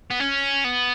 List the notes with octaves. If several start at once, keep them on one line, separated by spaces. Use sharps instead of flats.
B3
C#4
B3